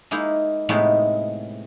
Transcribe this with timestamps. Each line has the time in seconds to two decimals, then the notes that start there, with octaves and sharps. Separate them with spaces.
0.11 G#3 A#3 D#4 E4
0.69 A2 C3 G#3 A3 B3 D#4